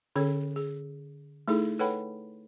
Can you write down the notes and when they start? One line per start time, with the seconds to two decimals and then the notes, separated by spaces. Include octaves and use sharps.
0.16 D3 C#4 G#4 A4 C#5
0.56 G#4
1.48 A3 D#4 E4 G#4 A4
1.79 A4 B4 C#5 F#5 G5 B5